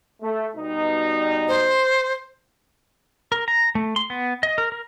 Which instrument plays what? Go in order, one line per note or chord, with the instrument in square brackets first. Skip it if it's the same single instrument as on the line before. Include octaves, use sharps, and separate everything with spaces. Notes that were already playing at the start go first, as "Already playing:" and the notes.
[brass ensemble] A3
B2 G3 D#4
[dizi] C5
[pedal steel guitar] A#4
A#5
A3
C6
B3
D#5
A#4
A#4